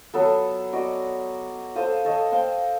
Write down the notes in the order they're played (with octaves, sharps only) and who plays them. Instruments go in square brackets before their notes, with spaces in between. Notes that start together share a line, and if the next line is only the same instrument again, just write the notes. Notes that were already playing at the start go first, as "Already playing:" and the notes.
[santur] F#3 B3 A4
B3 F#4 D5 D#5
A4 C5 F5 D#6
A4 C#5 D#5
C5 F5 G5 A5